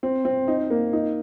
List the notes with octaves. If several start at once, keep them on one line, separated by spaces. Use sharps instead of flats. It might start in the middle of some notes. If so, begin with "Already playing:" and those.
C4
C4
D#4
A#3
D#4